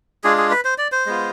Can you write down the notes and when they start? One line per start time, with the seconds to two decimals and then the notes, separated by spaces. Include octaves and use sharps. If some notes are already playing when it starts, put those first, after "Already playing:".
0.24 G#3 D4 F4 G#4
0.38 G#4
0.51 B4
0.65 C5
0.78 D5
0.92 C5
1.06 G#3 B3 F4